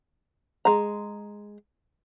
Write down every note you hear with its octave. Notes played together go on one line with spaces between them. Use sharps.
G#3 A#5